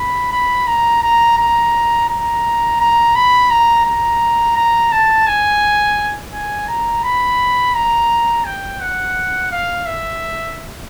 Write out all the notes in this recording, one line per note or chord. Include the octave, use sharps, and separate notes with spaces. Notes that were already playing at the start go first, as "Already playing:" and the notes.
Already playing: B5
B5
A#5
A#5
A#5
A#5
A#5
B5
A#5
A#5
A#5
A5
G#5
G#5
A#5
B5
A#5
G5
F#5
F5
E5